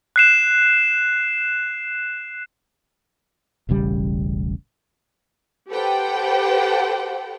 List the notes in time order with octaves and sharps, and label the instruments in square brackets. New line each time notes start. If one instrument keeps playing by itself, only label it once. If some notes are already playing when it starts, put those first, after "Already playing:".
[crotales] F#6 C7 E7
[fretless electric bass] E1 A1 C#3 G3
[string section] G4 A4 B4 C5 F#5 G5